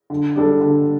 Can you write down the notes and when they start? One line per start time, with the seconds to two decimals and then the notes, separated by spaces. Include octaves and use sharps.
0.10 D3
0.36 G3 D4 A4
0.60 D3